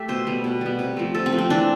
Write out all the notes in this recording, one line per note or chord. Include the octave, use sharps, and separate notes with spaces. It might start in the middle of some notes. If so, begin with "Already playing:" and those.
Already playing: A3 G4 E5
B2 C5
G3 B3
B2
G3 B3
C3
F3 A3
C3 A4
C4
F3 A3
C4
E3 D4